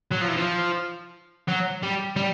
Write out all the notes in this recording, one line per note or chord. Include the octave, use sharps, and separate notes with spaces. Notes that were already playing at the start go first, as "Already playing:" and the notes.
F#3
F3
E3
F3
F#3
G3
G3